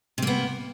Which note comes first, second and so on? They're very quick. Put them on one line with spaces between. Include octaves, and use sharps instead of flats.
C3 A#3 B3